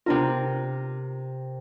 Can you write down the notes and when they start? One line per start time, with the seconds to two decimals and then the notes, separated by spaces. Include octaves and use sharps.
0.06 C3 B3 D4 F4 A#4